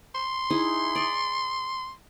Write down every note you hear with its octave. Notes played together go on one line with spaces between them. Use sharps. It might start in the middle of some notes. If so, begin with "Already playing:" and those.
C6
D#4 E4 G#4
D5 D#5